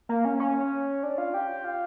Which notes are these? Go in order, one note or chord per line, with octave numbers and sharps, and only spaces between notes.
A#3
C#4
C#4
D4
F4
G4
F4